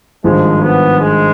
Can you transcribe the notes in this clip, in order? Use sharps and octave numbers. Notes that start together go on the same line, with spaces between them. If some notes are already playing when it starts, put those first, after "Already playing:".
G#1 G2 F3 G#3
B3
G#3